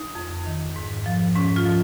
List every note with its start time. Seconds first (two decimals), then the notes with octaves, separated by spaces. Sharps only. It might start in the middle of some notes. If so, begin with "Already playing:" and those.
Already playing: D#4
0.15 F2
0.46 D#3
0.76 G#2
1.06 F3
1.35 G#2 C#4
1.56 F4
1.66 F3